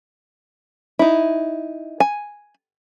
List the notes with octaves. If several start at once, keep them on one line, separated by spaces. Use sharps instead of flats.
D#4 E4
G#5